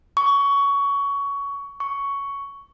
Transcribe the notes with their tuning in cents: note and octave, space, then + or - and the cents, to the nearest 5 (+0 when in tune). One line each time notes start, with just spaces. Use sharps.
C#6 +20
C#6 +10